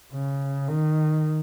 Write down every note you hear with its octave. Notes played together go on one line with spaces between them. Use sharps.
C#3
D#3